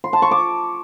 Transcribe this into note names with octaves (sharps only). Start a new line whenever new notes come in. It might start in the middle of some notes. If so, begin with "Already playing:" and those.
C6
A5
C#6
D6